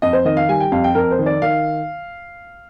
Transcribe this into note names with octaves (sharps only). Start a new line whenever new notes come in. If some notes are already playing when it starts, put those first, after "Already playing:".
F2 D#5
C5
D#3 D#5
F5
G3 G#5
G5
F2 F5
G5
F2 A#4
C5
D#3
D5
D#3 F5